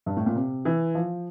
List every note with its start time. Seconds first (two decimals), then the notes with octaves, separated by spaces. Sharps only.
0.06 G2
0.17 A2
0.26 A#2
0.36 C3
0.65 E3
0.95 F3